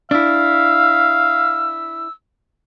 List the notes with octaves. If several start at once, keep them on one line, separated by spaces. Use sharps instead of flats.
D4 E4 F5 E6